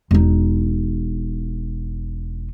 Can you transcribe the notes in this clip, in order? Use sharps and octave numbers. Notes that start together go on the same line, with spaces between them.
E1 D#4